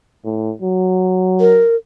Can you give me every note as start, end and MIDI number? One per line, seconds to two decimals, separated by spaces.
0.25 0.53 45
0.62 1.63 54
1.40 1.76 70